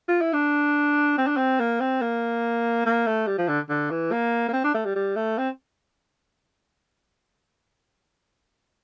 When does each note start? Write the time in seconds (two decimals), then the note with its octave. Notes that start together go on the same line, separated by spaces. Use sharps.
0.08 F4
0.21 E4
0.33 D4
1.18 C4
1.27 D4
1.37 C4
1.59 A#3
1.80 C4
2.01 A#3
2.86 A#3
3.07 A3
3.27 G3
3.38 F3
3.48 D3
3.70 D3
3.90 E3
4.12 A#3
4.49 A#3
4.53 C4
4.64 D4
4.74 A3
4.85 G3
4.95 G3
5.16 A3
5.38 C4